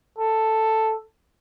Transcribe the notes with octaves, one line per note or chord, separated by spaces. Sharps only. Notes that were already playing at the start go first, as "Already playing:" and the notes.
A4